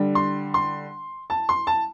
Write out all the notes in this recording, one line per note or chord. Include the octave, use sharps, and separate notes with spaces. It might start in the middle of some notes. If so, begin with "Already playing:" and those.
Already playing: D3 G3
C6
C6
A5
C6
A5